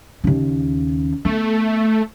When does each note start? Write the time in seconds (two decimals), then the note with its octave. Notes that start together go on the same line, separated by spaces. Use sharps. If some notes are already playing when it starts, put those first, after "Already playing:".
0.24 D#2 C#3
1.25 A3 B3